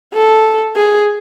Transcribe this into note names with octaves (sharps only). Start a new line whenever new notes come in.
A4
G#4